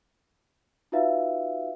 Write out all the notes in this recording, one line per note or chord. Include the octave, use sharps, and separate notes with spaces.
D#4 F4 F#4 B4 E5 F5